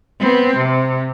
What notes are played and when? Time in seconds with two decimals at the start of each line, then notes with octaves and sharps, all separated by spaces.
0.20 B3 C4
0.57 C3